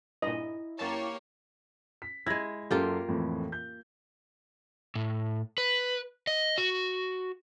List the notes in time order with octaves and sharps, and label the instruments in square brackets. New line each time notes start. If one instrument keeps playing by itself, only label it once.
[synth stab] G2 A#2 [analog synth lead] E4 [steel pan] D#5
[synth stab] F#2 A5 [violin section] A#3 G4 C#5
[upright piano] B6
[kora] G#3 E4 [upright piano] G#6 A#6
[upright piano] F#2 A4 C6 [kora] A#3 F4 G4
[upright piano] F2 A2 E3
G6
[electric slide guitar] A2
B4
D#5
F#4